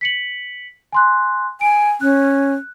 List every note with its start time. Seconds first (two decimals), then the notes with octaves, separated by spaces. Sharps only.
0.01 B6 C#7 F#7
0.93 G#5 C6 F#6
1.61 G#5 D7
2.01 C#4 F#6